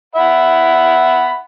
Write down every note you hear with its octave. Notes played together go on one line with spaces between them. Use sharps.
E5 F#5 B5